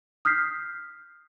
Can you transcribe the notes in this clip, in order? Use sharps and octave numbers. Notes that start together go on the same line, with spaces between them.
D#6 F6 G6 B6 C7